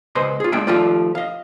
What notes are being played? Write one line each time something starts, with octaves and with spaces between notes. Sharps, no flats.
C#2 B4 C5 D#5 C6
F4 G#4
G#3 A#3 D4 E5 G5
D#3 F3 A3 F4 G4 D5
D#5 F5